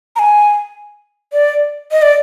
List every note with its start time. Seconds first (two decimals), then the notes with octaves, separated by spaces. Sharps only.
0.16 A#5
0.19 G#5
1.33 D5
1.92 D#5
2.02 D5